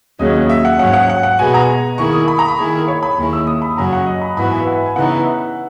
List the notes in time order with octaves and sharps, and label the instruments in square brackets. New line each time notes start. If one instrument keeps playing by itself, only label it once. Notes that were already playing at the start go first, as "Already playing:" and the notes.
[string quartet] D#2 C#3 F#3 [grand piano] D#5
[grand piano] E5
F#5
[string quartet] G#2 F#3 C#4 [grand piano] F#5
[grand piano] F#5
F#5
F#5
[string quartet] B2 G#3 B3 F#4 [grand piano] G#5
[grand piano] A#5
[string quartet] D#3 A#3 E4 G#4 [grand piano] C#6
[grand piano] D#6
B5
A#5
B5
[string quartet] D#3 A#3 E4 G#4
[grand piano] C#5
B5
[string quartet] D#2 D#3 G#3 C#4 E4
[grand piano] E6
D#6
B5
[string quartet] F#2 C#3 F#3 C#4 F#4 [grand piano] A#5
[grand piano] F#5
D#5
B5
[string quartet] G#2 E3 B3 F#4 [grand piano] B5
[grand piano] G#5
E5
F#5
G#5
[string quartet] C#3 E3 B3 D#4 [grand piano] F#5
[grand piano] E5